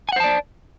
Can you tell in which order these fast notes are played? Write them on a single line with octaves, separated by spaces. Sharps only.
G#5 F#5 C5 A5 D5